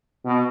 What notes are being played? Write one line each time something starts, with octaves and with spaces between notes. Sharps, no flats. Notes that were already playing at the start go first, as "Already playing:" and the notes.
B2